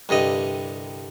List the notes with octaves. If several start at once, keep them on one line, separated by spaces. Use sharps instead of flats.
C2 G2 D3 D#5